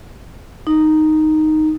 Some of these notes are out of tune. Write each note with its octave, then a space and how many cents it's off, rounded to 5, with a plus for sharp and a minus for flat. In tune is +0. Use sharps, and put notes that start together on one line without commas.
D#4 -5